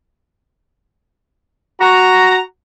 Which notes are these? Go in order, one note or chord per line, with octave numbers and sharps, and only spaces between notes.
F#4 A#5